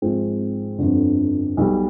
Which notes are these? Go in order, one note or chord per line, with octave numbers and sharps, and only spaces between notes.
G#1 G#2 F3 G#3 C4
G1 F2 D3
B1 B2 G3